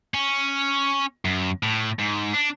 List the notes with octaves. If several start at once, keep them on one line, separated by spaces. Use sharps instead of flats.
C#4
F#2
A2
G#2
D4